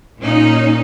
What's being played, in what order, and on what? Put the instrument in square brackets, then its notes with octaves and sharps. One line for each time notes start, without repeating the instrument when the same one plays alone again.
[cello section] A#2 C#4 D#4